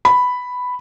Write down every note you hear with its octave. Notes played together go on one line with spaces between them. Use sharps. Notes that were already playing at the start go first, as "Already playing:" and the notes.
B5